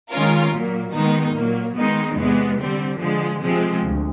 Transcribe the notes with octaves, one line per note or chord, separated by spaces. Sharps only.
D#3 G#3 C#4 F4 A#4
A#2 F#3 A#3
D#3 G#3 B3 D#4
A#2 F#3 A#3
D#3 G#3 B3 D#4
E2 C3 E3 G#3 B3
D3 G3 C4
D3 F3 G#3
C3 F3 G#3 C4
D2